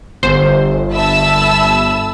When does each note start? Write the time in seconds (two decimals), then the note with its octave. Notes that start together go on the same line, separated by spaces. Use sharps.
0.23 G1 C5
0.92 E5 A5 B5 E6